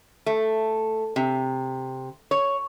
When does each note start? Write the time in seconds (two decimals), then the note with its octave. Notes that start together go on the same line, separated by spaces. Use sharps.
0.26 A3
1.16 C3
2.31 C#5